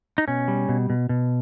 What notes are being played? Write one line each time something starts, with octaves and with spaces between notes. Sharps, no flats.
D#4
B2 C#4
G3
B2
B2
B2